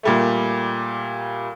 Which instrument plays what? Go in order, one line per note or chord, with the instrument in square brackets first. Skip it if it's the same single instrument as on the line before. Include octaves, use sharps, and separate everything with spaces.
[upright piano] A#2 G3 A3